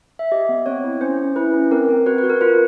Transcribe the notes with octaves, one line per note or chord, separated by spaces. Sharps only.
E5
G4 D#5
B3
C4 C#5
E4
C#4 C5
C#4
E4 B4
C#4
C4 A#4
C4
F#4 B4
B4
F#4
A#4
F4 B4